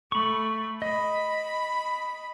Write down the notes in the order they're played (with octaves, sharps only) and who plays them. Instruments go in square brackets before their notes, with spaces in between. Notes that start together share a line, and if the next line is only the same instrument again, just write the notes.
[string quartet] A3 [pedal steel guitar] B5 C#6
[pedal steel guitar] D#5 [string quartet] B5